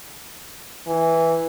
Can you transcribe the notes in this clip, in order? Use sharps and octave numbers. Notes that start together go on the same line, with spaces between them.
E3